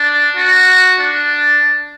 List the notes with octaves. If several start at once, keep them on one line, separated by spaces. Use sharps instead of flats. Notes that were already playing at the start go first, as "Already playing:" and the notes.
Already playing: D4
F#4
D4